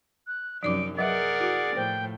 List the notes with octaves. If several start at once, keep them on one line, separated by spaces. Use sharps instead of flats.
F#6
F#2 C3 F3 D#4 D5 D6 D7
F#3 G#4 A#4 B4 D5 E5 F#5
E4 F#4
A2 F3 C5 G5